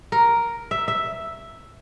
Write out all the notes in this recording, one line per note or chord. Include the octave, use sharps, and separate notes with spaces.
A#4
E5
E5